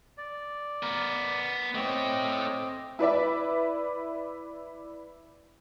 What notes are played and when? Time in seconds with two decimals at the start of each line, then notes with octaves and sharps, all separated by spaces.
0.18 D5
0.83 B3 A#4
1.75 A3 C4 C#5 D#5 D6
2.99 E4 B4 D5 E5